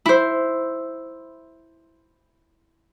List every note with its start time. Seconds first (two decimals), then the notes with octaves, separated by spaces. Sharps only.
0.06 E4 C5